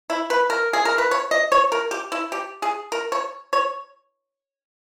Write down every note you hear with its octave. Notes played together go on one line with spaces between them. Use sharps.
E4
B4
A#4
G#4
A#4
B4
C#5
D#5
C#5
A#4
G4
E4
G4
G#4
A#4
C#5
C#5